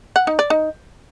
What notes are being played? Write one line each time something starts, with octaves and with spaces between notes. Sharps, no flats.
F#5
D#4
D5
D#4